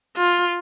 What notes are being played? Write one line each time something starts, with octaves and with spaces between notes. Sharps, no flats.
F4